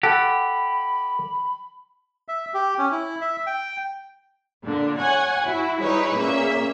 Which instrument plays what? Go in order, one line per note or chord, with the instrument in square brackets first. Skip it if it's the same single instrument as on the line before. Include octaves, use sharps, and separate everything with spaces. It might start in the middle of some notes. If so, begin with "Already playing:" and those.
[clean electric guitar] G4 [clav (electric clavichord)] A4 F#5 [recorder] B5
[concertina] E5
G4
C#4
E4
E5
G5
[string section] A#2 D3 D4
C#5 F#5 G#5
E4 F#4
G3 D#4 E4 G#4 B4 C#5
A#2 A#3 C#4 G#4 E5